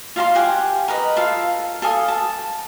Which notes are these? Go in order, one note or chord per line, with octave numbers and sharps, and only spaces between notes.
F4 F5 A#5 C6
G4 F#5 G#5
A#4 B4 D#5
F4 A4 F5
A4 F5 G#5 D#6
A5